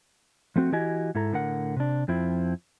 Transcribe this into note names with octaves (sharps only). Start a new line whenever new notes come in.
F3 A3 C4 F#4
E3 E4 F#4 G4 D#5 G#5
G#2 E4 A4 A#5
A2 D3 A#4 F#5
C3 D4
F2 F3 C4 E4